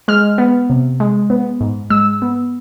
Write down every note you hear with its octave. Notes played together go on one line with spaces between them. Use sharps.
G#3 F6
B3
C3
G#3
B3
G#2
G#3 E6
B3